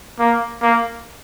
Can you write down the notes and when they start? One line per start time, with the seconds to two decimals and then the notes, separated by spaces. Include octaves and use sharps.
0.19 A#3
0.62 A#3